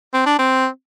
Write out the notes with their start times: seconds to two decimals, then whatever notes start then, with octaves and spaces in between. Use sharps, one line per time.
0.14 C4
0.26 D4
0.39 C4